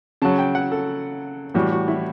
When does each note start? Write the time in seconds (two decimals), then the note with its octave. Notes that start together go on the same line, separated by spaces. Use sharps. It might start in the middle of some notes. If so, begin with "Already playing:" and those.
0.22 C#3 F#3 A5
0.39 G5
0.55 F#5
0.72 A4
1.54 A2 E3 G3 F#4
1.72 F#4
1.88 E4